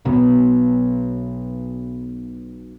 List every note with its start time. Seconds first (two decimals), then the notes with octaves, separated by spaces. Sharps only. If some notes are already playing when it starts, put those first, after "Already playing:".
0.05 B1 B2 B3